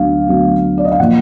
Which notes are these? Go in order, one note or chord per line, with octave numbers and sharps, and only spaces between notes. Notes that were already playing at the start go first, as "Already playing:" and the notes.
Already playing: D2 D3 F#3 B3 F5
D2 D3 F#3 B3
D5
D#5
F5
A#2 F3 A#3 F#5